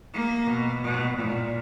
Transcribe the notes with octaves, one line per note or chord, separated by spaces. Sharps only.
A#3
B2
B2
A#2